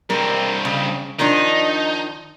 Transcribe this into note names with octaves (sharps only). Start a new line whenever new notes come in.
G2 C4 A#4
C#3
D#3 F3 D4 D#4